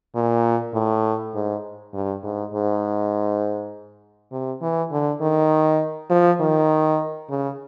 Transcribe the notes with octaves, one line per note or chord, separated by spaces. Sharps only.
A#2
A2
G#2
G2
G#2
G#2
C3
E3
D3
D#3
F3
D#3
C#3